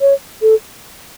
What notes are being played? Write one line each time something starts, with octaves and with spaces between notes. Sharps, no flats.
C#5
A4